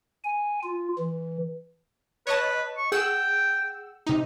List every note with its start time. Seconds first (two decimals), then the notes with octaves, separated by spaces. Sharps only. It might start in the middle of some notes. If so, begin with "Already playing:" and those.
0.24 G#5
0.63 F4
0.99 E3
2.27 B4 C#5 D#5 A5
2.77 C#6
2.92 G#4 F#5 G5 E6
4.06 C3 D#4